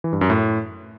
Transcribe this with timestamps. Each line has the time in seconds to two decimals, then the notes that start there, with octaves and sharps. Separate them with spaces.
0.04 E3
0.13 G2
0.21 F#2
0.30 A2